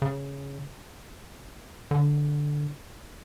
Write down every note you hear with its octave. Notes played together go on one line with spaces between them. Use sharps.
C#3
D3